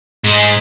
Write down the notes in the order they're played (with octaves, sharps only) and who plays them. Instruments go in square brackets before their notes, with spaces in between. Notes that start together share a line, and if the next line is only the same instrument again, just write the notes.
[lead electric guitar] G#2